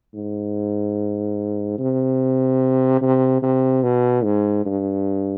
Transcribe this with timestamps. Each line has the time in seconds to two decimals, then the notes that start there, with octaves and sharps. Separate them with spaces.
0.14 G#2
1.78 C3
3.02 C3
3.42 C3
3.83 B2
4.24 G#2
4.66 G2